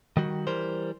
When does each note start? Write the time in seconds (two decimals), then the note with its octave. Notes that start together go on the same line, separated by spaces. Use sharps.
0.17 D#3 G3 F#4
0.47 E3 G3 A#4 C5